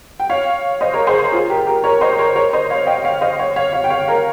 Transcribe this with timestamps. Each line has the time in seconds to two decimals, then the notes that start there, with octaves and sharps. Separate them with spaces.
0.20 G5
0.29 C#5 F5
0.81 C5 D#5
0.93 A#4 C#5
1.07 G#4 C5
1.32 F4 G#4
1.50 G4 A#4
1.67 G4 A#4
1.84 A#4 C#5
2.01 C5 D#5
2.19 A#4 C#5
2.36 A#4 C#5
2.53 C5 D#5
2.70 C#5 F5
2.87 D#5 G5
3.04 C#5 F5
3.21 C5 D#5
3.39 C#5 F5
3.56 C#5 F5
3.73 C#5 F5
3.84 G5
3.90 C#5 F5
4.08 A#4 C#5